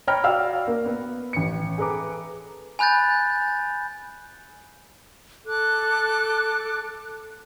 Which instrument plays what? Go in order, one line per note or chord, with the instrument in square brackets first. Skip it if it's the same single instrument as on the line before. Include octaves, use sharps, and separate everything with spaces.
[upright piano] C#5 G5 A#5 B5 F6 A#6
F#4 D5 F5 E6 F6
A#3
B3
A1 C#7
G#4 A4 B4 A#5 D6
[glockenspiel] G#5 B5 F#6 G6 A6
[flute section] A4 D6 F#6